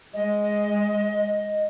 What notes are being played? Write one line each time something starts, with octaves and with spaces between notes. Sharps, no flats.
G#3 D#5